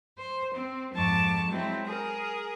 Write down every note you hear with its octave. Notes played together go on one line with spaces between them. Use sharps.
C5
C4
F2 G#2 A5 C#6 D6
F#3 G#3 C4 E4
G#4 A#4